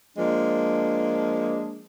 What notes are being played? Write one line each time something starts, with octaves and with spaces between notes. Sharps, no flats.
F3 G#3 A#3 D4